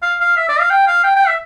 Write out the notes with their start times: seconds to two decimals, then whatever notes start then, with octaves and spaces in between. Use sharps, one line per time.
0.03 F5
0.20 F5
0.37 E5
0.49 D5
0.59 F5
0.70 G5
0.87 F5
1.04 G5
1.16 G5
1.27 E5